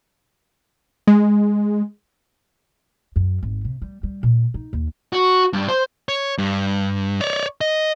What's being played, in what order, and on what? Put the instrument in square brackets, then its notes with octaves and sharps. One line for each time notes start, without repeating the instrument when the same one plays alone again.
[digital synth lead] G#3
[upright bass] F#2
G#1
C3
G3
G3
A#2
D#4
D#2
[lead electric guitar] F#4
G2
C5
C#5
G2
C#5 D5
D#5